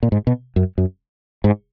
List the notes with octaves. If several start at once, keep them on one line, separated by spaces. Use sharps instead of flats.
A#2
G#2
B2
F#2
F#2
G#2